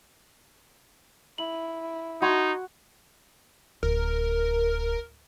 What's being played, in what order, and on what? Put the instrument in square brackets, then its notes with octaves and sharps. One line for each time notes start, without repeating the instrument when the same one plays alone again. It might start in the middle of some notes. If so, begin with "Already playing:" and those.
[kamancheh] E4 [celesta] F#7
[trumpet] D#4 [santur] F#4 [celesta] B5 C6 G#6
[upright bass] D1 [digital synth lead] A#4